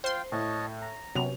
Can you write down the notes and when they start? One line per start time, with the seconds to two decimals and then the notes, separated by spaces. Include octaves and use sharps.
0.04 F4 C5 F5 G5 C6
0.32 A2 C#5 D#5 A5
0.82 A#5
1.15 C3 F#3 B3 C#4 F7